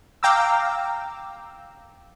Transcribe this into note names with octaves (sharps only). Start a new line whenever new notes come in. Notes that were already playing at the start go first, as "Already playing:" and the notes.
F5 G5 A#5 D6 E6